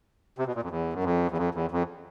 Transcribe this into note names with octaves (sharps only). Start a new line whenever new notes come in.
C3
B2
A#2
F2
E2
F#2
F2
E2
F2
E2
F2